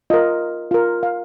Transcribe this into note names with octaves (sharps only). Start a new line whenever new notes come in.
F4 A#4 D#5
F4 A#4
F5